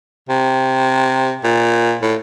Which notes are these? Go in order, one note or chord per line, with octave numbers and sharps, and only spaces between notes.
C3
A#2
A2